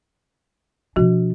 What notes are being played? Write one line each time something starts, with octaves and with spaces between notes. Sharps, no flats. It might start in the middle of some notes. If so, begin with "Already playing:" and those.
B2 F3 D4 F#4